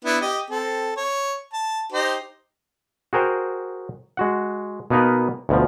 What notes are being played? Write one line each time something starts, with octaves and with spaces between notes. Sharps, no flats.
B3 D4 E4
G4 D#5
C4 A4
C#5
A5
D#4 G4 C5
F#4 G#4 A#4 C5 G5
G#3 F#4 F#5
B2 A#3 B3 D#4 A#4 B4
D2 B2 F3